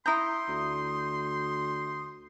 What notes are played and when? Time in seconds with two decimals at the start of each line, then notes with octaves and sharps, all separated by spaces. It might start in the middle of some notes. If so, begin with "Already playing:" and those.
0.06 E4 A#5 C6 D#6 G6
0.48 D2